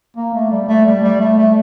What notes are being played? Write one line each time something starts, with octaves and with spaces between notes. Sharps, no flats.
A#3
A3
G3
A3
G3
G3
A3
A3